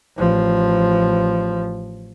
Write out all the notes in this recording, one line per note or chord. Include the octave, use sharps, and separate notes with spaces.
A1 F3